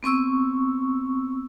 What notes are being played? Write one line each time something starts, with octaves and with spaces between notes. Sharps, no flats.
B3 C4 C#6 E6